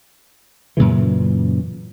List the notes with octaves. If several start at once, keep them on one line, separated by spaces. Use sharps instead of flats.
F#2 A#2 C#3 E3